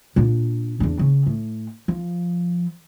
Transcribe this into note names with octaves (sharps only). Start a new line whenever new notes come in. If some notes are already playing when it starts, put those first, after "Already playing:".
A#2 D4
E2 D4
C#3
A2
F3